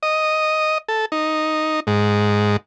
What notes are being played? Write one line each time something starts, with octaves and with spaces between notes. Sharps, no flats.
D#5
A4
D#4
G#2